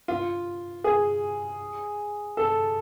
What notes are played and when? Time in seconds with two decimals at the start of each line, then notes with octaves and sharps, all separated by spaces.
0.08 F4
0.84 G#4
2.37 A4